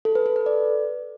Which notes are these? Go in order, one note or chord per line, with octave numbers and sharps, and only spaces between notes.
A4
B4
A4
B4
D5